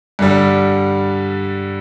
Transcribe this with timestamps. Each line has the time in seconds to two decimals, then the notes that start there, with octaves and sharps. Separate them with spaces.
0.19 G2 D3 G3